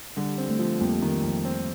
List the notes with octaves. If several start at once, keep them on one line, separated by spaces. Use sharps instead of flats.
D3 G3
C4
A3
F3
F2 G3 A#3
D#3
F2
C4